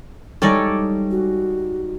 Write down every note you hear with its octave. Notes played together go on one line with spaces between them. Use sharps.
G3 G#3 D#4 A4 C#5 D5
F#4